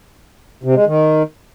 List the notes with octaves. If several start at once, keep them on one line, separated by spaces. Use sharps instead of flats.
C3
G#3
D#3